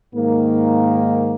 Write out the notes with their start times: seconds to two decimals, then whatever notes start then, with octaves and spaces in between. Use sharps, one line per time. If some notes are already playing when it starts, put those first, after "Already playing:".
0.14 G#2 D#3 A#3